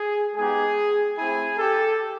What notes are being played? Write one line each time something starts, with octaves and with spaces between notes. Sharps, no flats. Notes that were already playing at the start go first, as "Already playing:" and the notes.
Already playing: G#4
G#3 B3 D#4 G4 G#4
A3 C4 E4 G#4
G4 A4